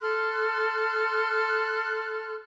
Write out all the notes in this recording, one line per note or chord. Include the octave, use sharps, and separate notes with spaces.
A4 C6 F6 F#6